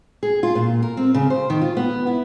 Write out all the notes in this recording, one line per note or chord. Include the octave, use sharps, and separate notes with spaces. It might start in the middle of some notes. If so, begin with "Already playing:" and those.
G#4
F4
A#2
A#4
C4
C#3
C5
D#3
F4
B3
E4